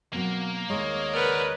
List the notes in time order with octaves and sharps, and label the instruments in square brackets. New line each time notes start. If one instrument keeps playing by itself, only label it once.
[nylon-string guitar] B2 F#3 C4 [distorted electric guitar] A#3 A#4
[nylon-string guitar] D#2 G#2 G#3 [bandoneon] C#5 D#5
[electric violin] A#4 B4 [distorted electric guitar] D5 F#5